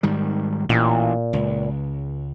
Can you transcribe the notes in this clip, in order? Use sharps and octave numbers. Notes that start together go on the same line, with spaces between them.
G#2 D#3 G3
A1 A#2
C#2